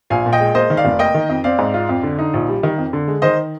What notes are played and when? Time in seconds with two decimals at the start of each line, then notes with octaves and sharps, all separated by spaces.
0.10 A#1 F5 G#5
0.26 A#2
0.33 D#5 G5
0.40 G#3
0.55 A#3 C5 D#5
0.70 D#3
0.77 D5 F5
0.85 F1
0.99 A#3 D#5 G5
1.14 D#3
1.29 F2
1.44 C4 D5 F5
1.59 G#2
1.74 F4
1.89 F2
2.03 D3
2.19 D#4
2.34 A#1
2.48 G3
2.63 D#3
2.78 F2
2.93 D3
3.08 G#3
3.22 D#3 C5 D#5